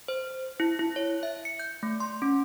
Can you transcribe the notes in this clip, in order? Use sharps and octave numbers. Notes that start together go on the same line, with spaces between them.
C5
E4
E4
C#5
E5
C#7
G6
A3
C6
C#4